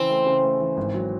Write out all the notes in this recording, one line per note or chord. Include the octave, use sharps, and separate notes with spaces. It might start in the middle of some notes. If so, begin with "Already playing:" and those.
Already playing: C#3 E3 C4
A3
C#3
A3
E3
G#1
F#3